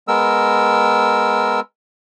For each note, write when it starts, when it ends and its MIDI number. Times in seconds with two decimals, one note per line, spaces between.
0.08 1.60 56
0.08 1.60 59
0.08 1.60 70
0.08 1.60 88